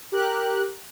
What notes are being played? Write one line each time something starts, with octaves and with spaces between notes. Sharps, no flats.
G4 A#4 F#6